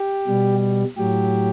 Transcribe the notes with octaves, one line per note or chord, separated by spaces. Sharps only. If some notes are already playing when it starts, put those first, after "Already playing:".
Already playing: G4
B2 G3
A2 F#3 G4